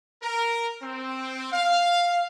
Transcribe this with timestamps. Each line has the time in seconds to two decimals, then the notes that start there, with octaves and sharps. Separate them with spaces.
0.22 A#4
0.82 C4
1.52 F5